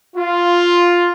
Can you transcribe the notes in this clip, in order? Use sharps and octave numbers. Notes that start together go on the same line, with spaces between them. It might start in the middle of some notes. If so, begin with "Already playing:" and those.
F4